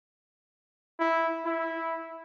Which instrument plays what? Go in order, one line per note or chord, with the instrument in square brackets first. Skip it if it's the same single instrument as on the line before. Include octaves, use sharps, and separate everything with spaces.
[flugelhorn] E4
E4